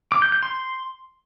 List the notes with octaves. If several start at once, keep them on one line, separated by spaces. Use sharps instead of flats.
D6
G6
G6
C6